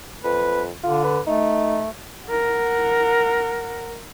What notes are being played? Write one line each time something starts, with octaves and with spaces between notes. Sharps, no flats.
F2 B4
D3 F4
B4
A3 D#4
A#4 F#5